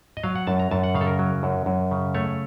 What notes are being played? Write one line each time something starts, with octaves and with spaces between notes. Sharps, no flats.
D#5
F#3 F5
F#5
F#2 A5
A#5
F#2 A5
F#5
C#3 F5
A4
A#4
F#3
F#2
F#2
C#3
A3 C#5